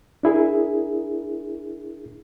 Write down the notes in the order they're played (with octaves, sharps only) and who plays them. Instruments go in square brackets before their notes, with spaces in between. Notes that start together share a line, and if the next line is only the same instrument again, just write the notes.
[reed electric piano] D4 E4 G#4 A#4